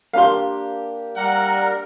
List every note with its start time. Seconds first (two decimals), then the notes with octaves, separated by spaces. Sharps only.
0.13 A#3 D4 G4 F5 C6
1.16 G3 A#4 F#5